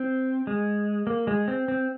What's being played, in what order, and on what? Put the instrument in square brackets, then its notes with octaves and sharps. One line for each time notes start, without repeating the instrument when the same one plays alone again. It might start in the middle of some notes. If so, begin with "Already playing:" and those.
Already playing: [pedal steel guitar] C4
G#3
A#3
G#3
C4
C4